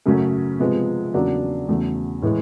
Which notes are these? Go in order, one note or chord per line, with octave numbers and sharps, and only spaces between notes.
F#2 C#3 F#3 A3 C#4
C3 F3 G#3 B3
E2 C#3 F#3 A#3 D4
E2 C#3 F#3 A3
A2 E3 G#3